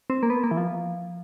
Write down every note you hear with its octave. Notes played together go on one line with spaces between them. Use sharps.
C4
A#3
B3
A#3
E3
F3